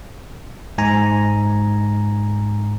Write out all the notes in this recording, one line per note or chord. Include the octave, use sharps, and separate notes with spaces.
G#2 G#5 A#5